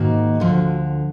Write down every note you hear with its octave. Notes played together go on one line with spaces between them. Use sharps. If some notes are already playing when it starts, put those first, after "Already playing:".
Already playing: G#2 D#3 A#3 F#4
D2 D3 F3